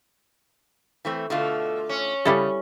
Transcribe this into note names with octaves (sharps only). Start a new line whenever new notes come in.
E3 A3 C4
B2 D3 A3 F4
C#4
C#3 G3 E4 A4